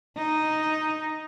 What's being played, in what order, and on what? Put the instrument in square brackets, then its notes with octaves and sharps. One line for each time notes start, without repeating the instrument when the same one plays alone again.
[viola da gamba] D#4